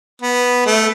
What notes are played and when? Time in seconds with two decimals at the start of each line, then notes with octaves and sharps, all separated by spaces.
0.22 B3
0.66 A3